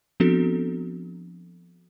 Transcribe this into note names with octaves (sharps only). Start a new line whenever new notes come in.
F3 B3 C4 D4 F#4 A4